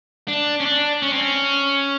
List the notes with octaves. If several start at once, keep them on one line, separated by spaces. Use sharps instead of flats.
D4
C#4
D4
C#4
C4
C#4